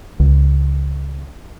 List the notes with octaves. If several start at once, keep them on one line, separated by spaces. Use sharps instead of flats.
C#2